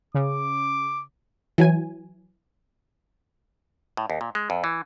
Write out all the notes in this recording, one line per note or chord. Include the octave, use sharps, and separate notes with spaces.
C#3 D6
E3 F#3 G#5
A2
D#2
A#2
G#3
F2
E3